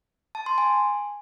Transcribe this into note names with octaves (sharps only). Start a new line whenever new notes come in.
A5
C6
G#5